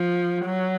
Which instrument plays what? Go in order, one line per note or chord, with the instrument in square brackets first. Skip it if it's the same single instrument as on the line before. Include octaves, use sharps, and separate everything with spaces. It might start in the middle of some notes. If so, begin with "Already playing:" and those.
Already playing: [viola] F3
F#3